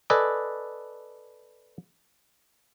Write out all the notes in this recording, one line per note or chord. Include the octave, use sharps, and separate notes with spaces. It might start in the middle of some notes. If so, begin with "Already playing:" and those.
A4 B4 D5 D#5 G#5